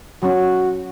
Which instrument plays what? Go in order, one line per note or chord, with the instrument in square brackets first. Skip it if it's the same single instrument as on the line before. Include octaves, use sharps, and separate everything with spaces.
[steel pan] F#3 C#4 [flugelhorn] F#4